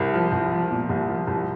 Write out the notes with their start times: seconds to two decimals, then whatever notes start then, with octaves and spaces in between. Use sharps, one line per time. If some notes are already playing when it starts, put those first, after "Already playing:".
Already playing: C2 A#4
0.14 F3
0.32 C2
0.52 F3
0.71 A#2
0.89 C2
1.09 F3
1.27 C2